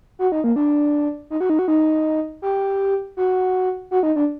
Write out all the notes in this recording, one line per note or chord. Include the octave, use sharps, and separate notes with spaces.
F#4
D#4
A#3
D4
D#4
F#4
D#4
F#4
D#4
G4
F#4
F#4
D#4
D4